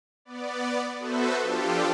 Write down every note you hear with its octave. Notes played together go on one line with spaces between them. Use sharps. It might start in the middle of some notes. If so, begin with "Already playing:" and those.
B3 D5
B3 F#4 A4 B4 C5 E5
F3 D4 F4 G4 A4